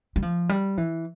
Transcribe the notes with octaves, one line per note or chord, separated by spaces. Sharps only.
G3
F3
G3
E3